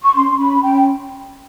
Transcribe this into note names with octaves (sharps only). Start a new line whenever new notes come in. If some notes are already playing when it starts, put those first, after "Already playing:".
C#6
C#4 C6
C#4 B5
C#4 G5